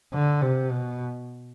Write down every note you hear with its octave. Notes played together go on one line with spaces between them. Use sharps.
D3
C3
B2